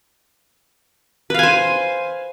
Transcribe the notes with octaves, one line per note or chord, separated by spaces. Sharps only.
B4 C5 F5 G#5